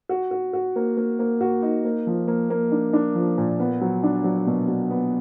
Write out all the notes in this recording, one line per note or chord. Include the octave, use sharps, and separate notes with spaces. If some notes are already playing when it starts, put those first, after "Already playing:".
F#4
F#4
F#4
A#3
A#3
A#3
F#4
D#4
A#3
F3
A#3
A#3
D4
D4
F3
A#2
B3
F#3
D4
F#3
B2
F#3
B3